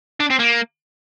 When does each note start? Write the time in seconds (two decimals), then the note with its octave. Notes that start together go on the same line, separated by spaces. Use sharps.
0.20 D4
0.30 C4
0.39 A#3